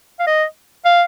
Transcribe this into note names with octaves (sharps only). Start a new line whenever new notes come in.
F5
D#5
F5